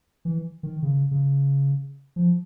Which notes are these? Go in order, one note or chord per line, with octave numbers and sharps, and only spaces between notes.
E3
D#3
C#3
C#3
F3